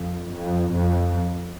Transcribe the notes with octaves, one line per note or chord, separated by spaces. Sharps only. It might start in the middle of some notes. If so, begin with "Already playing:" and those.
Already playing: F2
F2
F2